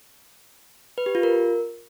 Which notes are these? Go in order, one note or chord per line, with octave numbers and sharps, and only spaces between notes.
B4
G4
F4
A#4